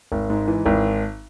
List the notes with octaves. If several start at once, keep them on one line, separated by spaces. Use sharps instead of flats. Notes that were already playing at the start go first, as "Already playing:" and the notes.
G#1
G#2
E3
G#1